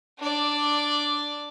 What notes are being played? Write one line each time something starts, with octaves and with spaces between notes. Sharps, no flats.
D4 D5